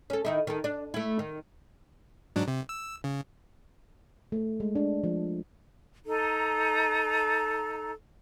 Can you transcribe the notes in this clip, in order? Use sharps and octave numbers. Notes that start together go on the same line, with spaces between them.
C#4 A4
D#3 D#4 E4
D#3 A4
D4
A3 E4
D#3
G#2 F#3 D4
C3
E6
C#3
A3
G#3
D4
F3
D#4 A4 A#5